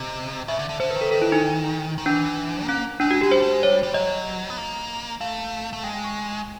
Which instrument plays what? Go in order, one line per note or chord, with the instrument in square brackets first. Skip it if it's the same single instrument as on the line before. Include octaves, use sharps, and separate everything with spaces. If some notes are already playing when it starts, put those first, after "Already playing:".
Already playing: [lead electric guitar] C3 [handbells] D#5
[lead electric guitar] C#3 [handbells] E5
[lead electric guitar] D3
D3
[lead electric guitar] D3 [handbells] C5
[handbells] B4
[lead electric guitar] D#3
[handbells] A4
[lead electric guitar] D#3 [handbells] A4
[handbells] E4
D#4
[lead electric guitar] D#3
[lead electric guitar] E3 [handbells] D4
[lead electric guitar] B3
[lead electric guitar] A#3 [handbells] C#4
[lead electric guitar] G#3 [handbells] D4
[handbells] F#4
[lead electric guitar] G#3 [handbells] G4
[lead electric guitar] G3 [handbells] C5
[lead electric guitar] A3
G#3
[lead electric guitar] G3 [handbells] C#5
[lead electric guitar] G3
[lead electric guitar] F#3 [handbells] D#5
[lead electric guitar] B3
A#3
[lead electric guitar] A3 [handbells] F5
[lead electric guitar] A3
[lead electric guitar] G#3 [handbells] G5
[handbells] G5
C#6